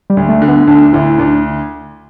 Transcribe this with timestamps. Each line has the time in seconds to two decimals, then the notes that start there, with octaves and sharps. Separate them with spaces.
0.10 G3
0.17 D2
0.29 A3
0.42 D3
0.48 B3
0.67 D2 D4
0.93 D2 E4
1.18 D2 D4